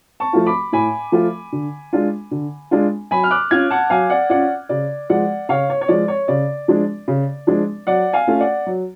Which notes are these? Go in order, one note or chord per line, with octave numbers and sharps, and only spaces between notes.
A5 C#6
F3 A3 F4
B5 D6
A2 G#5 B5
F3 A3 F4
D3
G#3 D4 F4
D3
G#3 D4 F4
F#3 G#5 B5
F6
D6 F#6
C#4 F4 F6 G#6
F#5 A5
F#3 F5 G#5
D5 F#5
C#4 F4 D5 F#5
C#3 D5
F3 G#3 D5 F#5
C#3 C#5 F5
C#5
C#5
F3 G#3 D5
C#5
C#3 D5
F3 G#3 D4
C#3
F3 G#3 D4
F#3 D5 F#5
F5 G#5
A3 C#4 F4
D5 F#5
F#3